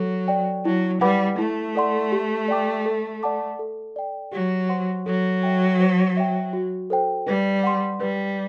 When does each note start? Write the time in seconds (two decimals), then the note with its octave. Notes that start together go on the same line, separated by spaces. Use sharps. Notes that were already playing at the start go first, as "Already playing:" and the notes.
Already playing: F#3 A4
0.28 D5 G5
0.65 F#3 E4
1.01 G3 B4 F#5 B5 D6
1.38 A3 E4
1.75 A4 D5 F#5 C6
2.12 G4
2.48 D5 G5 D6
2.86 A4
3.23 D5 F#5 A5 D6
3.59 A4
3.96 D5 G5
4.33 F#3 G4
4.69 C5 F#5 C6
5.06 F#3 A4
5.43 E5 G5
5.80 C5
6.17 E5 G5
6.53 F#4
6.90 A4 C5 G5
7.27 G3 B4
7.63 F#5 C6
8.01 G3 B4